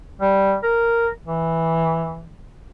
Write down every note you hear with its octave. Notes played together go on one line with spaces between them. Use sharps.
G3
A#4
E3